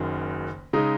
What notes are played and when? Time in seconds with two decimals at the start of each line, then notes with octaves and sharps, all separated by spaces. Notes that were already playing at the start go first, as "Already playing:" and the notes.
Already playing: F#1 F#2 D#3
0.73 C#3 G#3 D#4